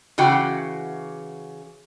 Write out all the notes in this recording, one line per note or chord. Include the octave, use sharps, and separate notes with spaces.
C#3 E3 F#4 G5